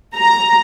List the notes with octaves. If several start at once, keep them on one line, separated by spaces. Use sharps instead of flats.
A#5